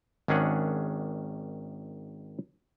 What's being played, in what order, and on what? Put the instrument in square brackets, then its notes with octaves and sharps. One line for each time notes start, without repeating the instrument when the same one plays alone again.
[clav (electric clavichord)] G#1 D#3 C#4 D4 G#4 F#5